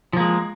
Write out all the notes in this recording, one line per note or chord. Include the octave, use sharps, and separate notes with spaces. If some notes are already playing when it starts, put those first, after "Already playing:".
F3 G#3 A#3